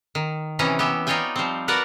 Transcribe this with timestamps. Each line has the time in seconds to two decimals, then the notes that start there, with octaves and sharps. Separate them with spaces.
0.15 D#3
0.59 C3 E3 C#4 D#4 E4 A#5
0.79 B3 G4 E5
1.07 D#4 F4 C#5 D5 G5 G#5
1.36 F3 G3 C4
1.68 F#4 A#4 B4 D5 F#5